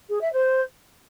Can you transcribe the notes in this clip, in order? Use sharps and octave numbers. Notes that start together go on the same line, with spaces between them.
G#4
E5
C5